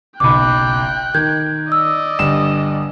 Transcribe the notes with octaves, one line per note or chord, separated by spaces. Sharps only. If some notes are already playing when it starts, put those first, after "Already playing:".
F#1 B1 G5 B5 D6 F#6
D#3 G6 G#6
D5 D#5 E6
G1 G3 E7